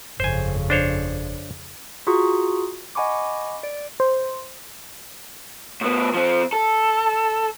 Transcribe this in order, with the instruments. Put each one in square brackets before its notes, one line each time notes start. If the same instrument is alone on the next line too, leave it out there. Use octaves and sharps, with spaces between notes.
[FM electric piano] G1 [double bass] F2 C#3 [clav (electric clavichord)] C5 G#5
[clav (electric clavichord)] D4 C5 C#5
[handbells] F4 F#4 G#4 A#5 C#6 D#6
D#5 F#5 G#5 B5 C#6 D6
D5 D7
[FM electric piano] C5
[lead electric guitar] A2 B3
F3 C4
A4